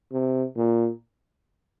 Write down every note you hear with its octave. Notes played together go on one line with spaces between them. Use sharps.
C3
A#2